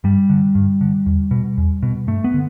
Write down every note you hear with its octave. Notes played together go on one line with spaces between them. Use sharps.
G2 G3
D3
G2
D3
E2
B2
E2
B2
G2 A3
B3
D3